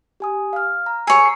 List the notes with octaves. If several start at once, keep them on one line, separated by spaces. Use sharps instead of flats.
G4 G#5 D#6
F5 F6
A#5
G#4 C#5 E6
A#5 C#6 C7